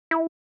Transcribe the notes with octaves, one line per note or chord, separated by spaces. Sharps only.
E4